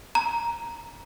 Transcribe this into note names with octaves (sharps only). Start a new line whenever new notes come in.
A#5